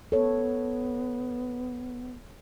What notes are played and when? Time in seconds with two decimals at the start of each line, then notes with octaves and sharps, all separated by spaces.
0.12 B3 A4 C#5